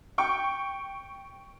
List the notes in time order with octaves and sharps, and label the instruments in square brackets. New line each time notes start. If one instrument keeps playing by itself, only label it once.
[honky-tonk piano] G5 C#6